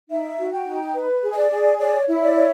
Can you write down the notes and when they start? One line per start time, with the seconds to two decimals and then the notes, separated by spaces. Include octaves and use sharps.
0.09 D#4 E5
0.38 F#4
0.52 G5
0.66 D#4
0.95 B4
1.23 G#4
1.33 D#5
1.37 D5
1.51 G#4
1.79 C#5 D5
2.07 E4
2.22 D5
2.36 C#5